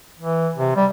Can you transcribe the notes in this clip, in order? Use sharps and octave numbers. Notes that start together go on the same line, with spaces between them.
E3
C3
G3